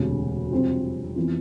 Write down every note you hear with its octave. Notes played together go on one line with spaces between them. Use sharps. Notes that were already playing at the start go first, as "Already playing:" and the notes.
Already playing: E1 D2 C3
F2 C3 G3 C4 F4
F2 E3 B3